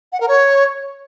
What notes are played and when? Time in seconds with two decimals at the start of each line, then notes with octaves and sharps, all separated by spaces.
0.12 F#5
0.20 A#4
0.28 C#5